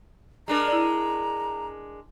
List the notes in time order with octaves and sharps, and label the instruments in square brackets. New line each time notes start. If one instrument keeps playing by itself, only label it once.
[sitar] G#3 D4 A#4 [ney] A#5
[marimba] E4 D5